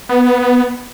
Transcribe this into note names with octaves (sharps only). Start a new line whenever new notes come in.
B3